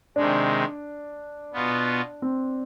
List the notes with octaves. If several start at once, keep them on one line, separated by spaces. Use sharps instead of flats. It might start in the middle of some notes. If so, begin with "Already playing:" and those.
C3 D#3 G#3 D4
B2 B3 F4
C4